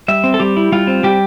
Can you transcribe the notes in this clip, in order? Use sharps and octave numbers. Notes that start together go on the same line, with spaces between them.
G3 E5
C4
A4
G3 G4
E4
G3 F4
C4
G3 G4